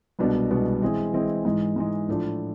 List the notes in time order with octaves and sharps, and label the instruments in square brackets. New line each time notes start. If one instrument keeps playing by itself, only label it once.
[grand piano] C2 B2 G#3 B3 D4
C2 B2 G#3 B3 D4
E3 G#3 C4 E4 G#4
E3 G#3 C4 E4 G#4
G#2 E3 G#3
G#2 E3 G#3
A2 F3 A3 D4